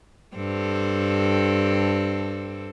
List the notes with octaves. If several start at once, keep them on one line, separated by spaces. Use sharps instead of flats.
G2 C4 A4